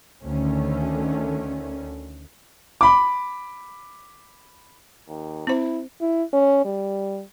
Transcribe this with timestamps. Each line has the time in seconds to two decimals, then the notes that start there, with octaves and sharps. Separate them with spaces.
0.22 D2 D3 D#3 A3 C#4
2.81 B5 D6
5.08 D#2
5.47 C4 E4 C5
6.01 E4
6.33 C#4
6.65 G3